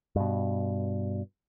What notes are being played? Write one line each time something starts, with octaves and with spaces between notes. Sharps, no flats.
G2 B2